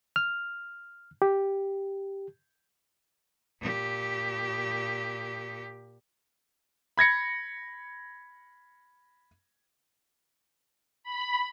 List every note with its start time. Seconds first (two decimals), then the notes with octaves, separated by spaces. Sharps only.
0.16 F6
1.22 G4
3.61 A#2 G4
6.98 B5 G#6 A#6 C#7
11.04 B5